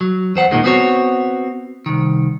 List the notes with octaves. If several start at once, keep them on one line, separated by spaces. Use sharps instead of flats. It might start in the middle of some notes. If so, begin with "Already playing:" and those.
F#3
E2 C5 F#5
D#2 A#2 D#3 G#3
B3 C4 F#4 C#5
C2 D#3